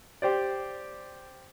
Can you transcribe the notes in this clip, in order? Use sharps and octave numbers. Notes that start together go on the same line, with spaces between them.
G4 C5 D5